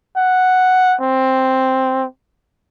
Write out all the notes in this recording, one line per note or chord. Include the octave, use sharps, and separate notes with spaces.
F#5
C4